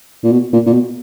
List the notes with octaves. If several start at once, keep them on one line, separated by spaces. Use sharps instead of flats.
A#2
B2
A#2
A#2
B2